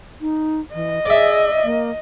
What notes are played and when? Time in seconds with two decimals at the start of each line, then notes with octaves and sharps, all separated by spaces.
0.21 D#4
0.74 E3 D#5
1.06 G#4 D5 E5
1.64 A#3